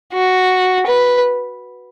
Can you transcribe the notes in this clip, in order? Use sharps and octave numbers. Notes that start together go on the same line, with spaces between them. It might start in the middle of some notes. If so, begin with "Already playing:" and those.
F#4
B4